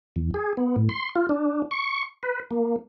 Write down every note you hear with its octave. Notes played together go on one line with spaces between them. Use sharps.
E2
G#4
B3
A2
C6
F4
D4
C#6
B4
A#3